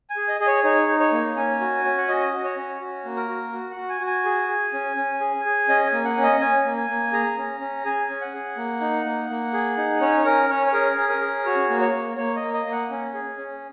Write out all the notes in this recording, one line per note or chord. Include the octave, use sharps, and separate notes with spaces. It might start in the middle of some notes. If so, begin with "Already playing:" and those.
G#5
G#4
D#5
G#4 D#5
C#5
D#4 C#5
D#4
C#5
A#3
C#4 G#5
F#4
C#4
F#5
F#4 D#5
F#4
C#5
C#4
F#4
A#3
A#4
F#4
F#4
F#5
F#4
G#5
F#4
G#5
G#4
G#4
C#4
C#4
G#4
G#4
C#4 D#5
G#5
A#3
F#5
C#4
D#5
C#4 G#5
A#3
G#5
A#3
G#4 A#5
C#4
C#4
G#4 G#5
C#4
F#5
G#4
A#3
D#4
A#3
A#3
G#4
D#4
C#4 C#5
C#4 A#4
C#4 C#5
C#5
G#4 A#4
C#4
A#4
G#4
F#4 C#5
A#3
C#5
A#3
A#3 C#5
D#5
A#3
D#5
A#3
F#5
C#4
G#4
C#4